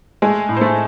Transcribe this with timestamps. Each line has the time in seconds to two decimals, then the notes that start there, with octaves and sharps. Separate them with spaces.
0.22 G#3 A3 G#4
0.49 A2
0.57 C5
0.61 A3 A4